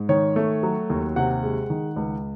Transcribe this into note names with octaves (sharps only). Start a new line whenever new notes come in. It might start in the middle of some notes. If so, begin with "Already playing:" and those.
Already playing: G#2
D#3 C#5
A3
F#3
D#2
C3 F#5
G#3
D#3
C#2